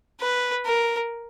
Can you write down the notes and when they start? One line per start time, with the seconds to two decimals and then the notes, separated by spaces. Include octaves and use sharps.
0.21 B4
0.65 A#4